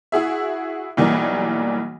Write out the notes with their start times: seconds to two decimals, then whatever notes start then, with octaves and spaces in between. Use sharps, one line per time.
0.12 E4 F#4 G#4 E5
0.97 B1 E3 G3 A#3